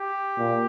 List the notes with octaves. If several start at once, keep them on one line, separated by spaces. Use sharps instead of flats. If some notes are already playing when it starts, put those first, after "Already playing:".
Already playing: G4
A#2